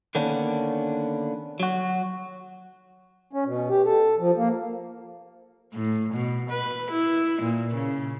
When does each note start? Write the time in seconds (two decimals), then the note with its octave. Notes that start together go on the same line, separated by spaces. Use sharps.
0.15 D3 D#3 A#3 B3 C#4 D4
1.60 F#3 F#4
3.33 C#4
3.46 B2
3.69 G4
3.85 A4
4.19 F3
4.37 A#3
5.74 A2
6.13 B2
6.50 B4
6.91 E4
7.42 A#2
7.74 C#3